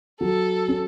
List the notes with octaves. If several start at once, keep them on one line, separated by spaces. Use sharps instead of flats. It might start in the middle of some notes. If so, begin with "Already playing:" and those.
F#3 A4
C#4